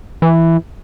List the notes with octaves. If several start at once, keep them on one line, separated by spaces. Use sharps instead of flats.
E3